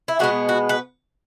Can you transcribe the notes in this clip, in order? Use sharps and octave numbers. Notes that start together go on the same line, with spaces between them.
E4
B2 G#3 B3 F#4
F#4
B4